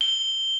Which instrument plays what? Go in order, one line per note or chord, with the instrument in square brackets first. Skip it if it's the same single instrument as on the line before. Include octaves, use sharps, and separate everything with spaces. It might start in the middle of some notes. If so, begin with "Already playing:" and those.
[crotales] G7